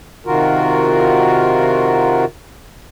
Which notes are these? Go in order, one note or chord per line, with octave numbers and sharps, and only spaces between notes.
C3 D#3 F4 F#4 A#4